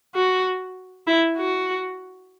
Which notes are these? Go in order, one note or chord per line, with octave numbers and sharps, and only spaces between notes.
F#4
E4
F#4